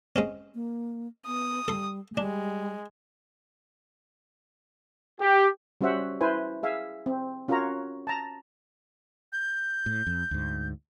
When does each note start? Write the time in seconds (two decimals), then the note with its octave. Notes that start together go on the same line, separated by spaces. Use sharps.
0.16 G#3 C4 C#4
0.55 A#3
1.27 B3 D#6
1.68 G3 A4 C6
2.17 G3 G#3 D4
5.21 G4
5.81 G3 C#4 F#4 C5 E5 F#5
6.21 E4 B4 C5 G#5
6.63 G#4 E5 F5 G#5
7.06 C4
7.48 C#4 F4 F#4 A#4 C#5 A#5
8.07 A5 A#5
9.33 G6
9.86 A2
10.07 F2
10.31 D2 G#2